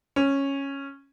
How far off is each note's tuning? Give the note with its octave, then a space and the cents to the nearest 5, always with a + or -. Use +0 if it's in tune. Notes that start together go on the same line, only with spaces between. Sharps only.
C#4 -10